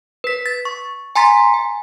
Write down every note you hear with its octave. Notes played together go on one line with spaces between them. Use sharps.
B4 B6
A6
C#6
G#5 A#5 C6 A6 B6
G#5